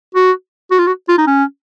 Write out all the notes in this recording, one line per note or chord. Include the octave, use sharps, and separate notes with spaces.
F#4
F#4
F4
F#4
F4
D#4
C#4